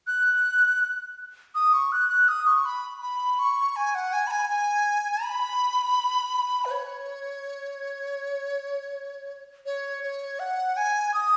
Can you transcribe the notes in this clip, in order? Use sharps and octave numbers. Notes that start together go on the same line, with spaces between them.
F#6
D#6
C#6
F#6
F#6
D#6
C#6
B5
B5
C#6
G#5
F#5
G#5
B5
G#5
G#5
B5
B4
C#5
C#5
C#5
F#5
G#5
D#6